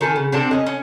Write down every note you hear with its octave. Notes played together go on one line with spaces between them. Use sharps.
D#3 A4 G#5
C#3
C3 C4 D4 A4
C#4 D#5
C#4